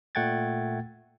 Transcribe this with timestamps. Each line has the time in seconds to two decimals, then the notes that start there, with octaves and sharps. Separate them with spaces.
0.15 A#2 A3 F#5 G5 G#6 A6